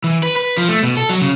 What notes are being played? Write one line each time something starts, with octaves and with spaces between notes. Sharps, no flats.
E3
B4
B4
F3
A3
B2
A4
F#3
C#3